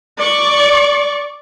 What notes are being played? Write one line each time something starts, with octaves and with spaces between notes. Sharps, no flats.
D5 C#6